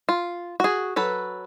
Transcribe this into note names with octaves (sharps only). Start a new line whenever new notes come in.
F4
F#4 G#4
F#3 A4 B4